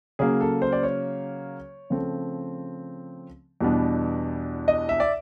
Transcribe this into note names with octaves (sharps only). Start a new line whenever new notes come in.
C#3 F#3 A#3 G#4
A4
C5
D5
C#5
C#3 F3 A3 C4
E2 B2 G3 B3 D4
D#5
E5
D5